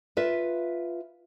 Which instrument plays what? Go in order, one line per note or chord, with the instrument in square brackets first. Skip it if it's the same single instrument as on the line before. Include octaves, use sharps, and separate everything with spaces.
[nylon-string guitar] F4 B4 E5